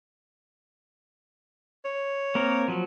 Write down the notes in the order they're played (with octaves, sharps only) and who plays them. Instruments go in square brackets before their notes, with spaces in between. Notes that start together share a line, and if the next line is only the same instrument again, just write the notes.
[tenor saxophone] C#5
[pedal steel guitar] A#3 C4 A#4
F3 F#3